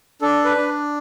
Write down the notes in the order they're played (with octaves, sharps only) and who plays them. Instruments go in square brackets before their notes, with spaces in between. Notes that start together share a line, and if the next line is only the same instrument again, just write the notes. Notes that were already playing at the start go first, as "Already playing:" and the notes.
[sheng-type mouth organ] D4 A4
B4
D4